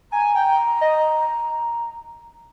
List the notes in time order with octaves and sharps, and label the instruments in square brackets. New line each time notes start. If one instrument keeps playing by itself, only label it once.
[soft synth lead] G#5 [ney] A#5
[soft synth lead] G5
D#5